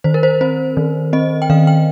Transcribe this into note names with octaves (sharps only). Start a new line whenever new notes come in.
D#3 C5
A#4
C5
C4 C5
D#3
C4 D#5
G5
D#3 F5
G5